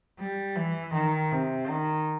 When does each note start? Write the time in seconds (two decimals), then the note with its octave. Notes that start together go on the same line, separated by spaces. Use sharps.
0.19 G3
0.56 E3
0.94 D#3
1.31 C3
1.69 D#3